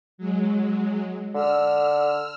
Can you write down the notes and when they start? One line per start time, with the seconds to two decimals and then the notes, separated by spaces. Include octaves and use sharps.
0.18 F#3 G#3
1.34 D3 E6 F6